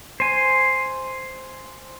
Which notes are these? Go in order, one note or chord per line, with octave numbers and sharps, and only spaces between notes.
C5 G#5